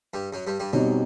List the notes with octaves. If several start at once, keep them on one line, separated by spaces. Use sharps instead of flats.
G2 G3
F#2 F#3
G2 G3
G2 G3
F#2 B2 F#3 G3 C4 D#4